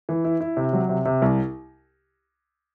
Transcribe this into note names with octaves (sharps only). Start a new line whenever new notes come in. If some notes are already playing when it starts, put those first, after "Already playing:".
E3
E4
E4
C3
F#3
C3
C3
C2